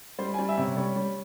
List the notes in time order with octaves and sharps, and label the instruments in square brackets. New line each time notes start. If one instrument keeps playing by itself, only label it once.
[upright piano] G3 C5
G3 G#5
E5
C3
C#5
G3 C#5
G3